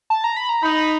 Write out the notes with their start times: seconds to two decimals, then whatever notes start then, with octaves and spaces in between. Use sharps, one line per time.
0.10 A5
0.24 A#5
0.37 B5
0.49 A#5
0.62 D#4 B5
0.76 B5